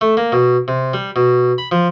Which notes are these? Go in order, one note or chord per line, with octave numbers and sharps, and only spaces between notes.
A3
A#3
B2
C3
G3
B2
B5
F3